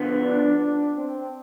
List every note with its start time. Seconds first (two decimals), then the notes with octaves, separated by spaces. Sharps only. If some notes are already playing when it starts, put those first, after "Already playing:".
Already playing: D3 F3 B3
0.22 D4
0.58 D4
0.96 C4